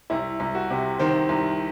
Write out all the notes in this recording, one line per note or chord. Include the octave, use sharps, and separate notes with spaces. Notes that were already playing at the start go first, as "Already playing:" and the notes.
C2 E4
C2
F#4
C3
D#3 C5
C2